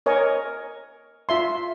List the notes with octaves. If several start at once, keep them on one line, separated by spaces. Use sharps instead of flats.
A#4 C#5 D#5 G#5
F4 E5 C6